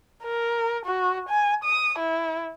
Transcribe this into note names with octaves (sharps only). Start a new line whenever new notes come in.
A#4
F#4
G#5
D#6
E4